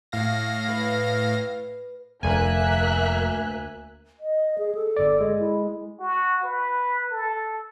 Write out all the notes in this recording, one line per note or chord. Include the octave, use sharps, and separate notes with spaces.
A2 F5 A#6
B4
F1 D2 A#3 E5 G#5 F#6
D#5
G#4
A4
G1 D5
G#3
E4
F#4
B4
A4